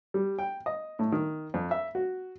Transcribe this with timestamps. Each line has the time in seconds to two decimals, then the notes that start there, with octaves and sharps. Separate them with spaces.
0.14 G3
0.39 G5
0.66 D#5
0.99 A2
1.12 D#3
1.54 F2
1.71 E5
1.95 F#4